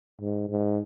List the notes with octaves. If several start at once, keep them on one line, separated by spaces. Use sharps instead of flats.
G#2
G#2